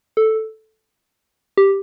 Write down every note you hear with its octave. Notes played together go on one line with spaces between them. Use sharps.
A4
G4